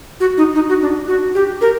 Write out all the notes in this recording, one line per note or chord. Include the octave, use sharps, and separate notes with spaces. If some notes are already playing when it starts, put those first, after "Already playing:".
F#4
D#4
D#4
F#4
D4
F#4
G4
A#4